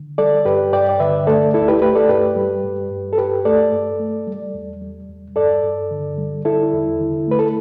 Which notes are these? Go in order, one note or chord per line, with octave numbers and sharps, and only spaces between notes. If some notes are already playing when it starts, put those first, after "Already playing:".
Already playing: D3
G3 A4 D5
G2 G4 B4
G2 D5 G5
D5
D3 B4 E5
A3 A4 D5
D2 E4 A4
G4 B4
A3 G4 B4
A4 D5
G2 G4 B4
G3
G2
G2
A4
G2 G4 B4
A3 A4 D5
G2
A3
G3
E2
G3
E2
G2 A4 D5
G2
D3
G3
D3 E4 A4
E2
D3
A3 B4
A4